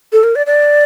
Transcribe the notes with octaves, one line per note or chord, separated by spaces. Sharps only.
A4
A#4
D5
D5